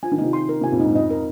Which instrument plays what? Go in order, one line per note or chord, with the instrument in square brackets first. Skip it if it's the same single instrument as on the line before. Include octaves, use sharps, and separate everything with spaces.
[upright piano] F3 [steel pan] G#5
[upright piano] D#3
[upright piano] C3 F3 [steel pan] D#4
[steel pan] C6
A#4
[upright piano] C3 F3 [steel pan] G#5
[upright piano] F2 A#2
[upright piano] G#2 [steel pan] D#4
[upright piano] F2 [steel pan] D#5
[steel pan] A#4